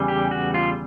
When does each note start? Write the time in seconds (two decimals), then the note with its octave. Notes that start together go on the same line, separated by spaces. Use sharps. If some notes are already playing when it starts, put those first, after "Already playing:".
Already playing: E2 C#3 E3 G3
0.08 G4
0.31 F#4
0.54 F4